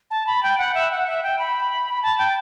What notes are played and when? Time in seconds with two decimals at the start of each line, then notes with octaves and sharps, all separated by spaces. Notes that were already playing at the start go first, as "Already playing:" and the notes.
0.11 A5
0.27 B5
0.43 G5
0.58 F#5
0.75 E5
0.91 F#5
1.07 E5
1.23 G5
1.39 B5
2.02 A5
2.18 G5